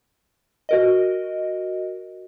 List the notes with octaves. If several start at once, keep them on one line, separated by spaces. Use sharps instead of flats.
F#4 A#4 D#5